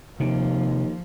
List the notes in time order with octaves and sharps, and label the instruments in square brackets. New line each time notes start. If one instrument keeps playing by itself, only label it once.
[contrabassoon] D#2 [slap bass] C3 [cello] F3